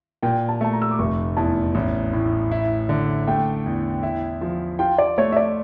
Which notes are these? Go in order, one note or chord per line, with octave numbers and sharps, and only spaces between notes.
A#2 G5
A5
A3 A5
A#5
E6
D6
F1 C#6
E2 A5
A1
A2
E4
D3
A3 G5
E2
E4
F3
F4 G5
D5
A3 C#5
E5
D5